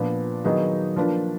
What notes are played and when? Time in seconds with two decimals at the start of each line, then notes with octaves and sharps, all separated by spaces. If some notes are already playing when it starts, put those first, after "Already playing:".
Already playing: A#2 F3 B3 D4
0.44 D#3 F#3 B3 D#4 G#4
0.96 F3 A#3 D4 F4 B4